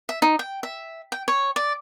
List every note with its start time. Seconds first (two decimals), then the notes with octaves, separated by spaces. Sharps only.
0.09 E5
0.22 D#4
0.39 G5
0.63 E5
1.12 G5
1.28 C#5
1.56 D5